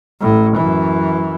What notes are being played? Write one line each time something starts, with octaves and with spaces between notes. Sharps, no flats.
A1 A2
F#2 E3